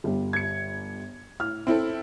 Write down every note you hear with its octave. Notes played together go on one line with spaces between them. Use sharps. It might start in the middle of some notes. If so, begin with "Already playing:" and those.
G1 G3
G#6 C#7
A2 F6
C4 E4 A4